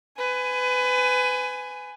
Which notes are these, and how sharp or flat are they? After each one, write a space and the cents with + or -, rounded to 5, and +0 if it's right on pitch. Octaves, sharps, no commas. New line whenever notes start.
B4 +25 G#5 +0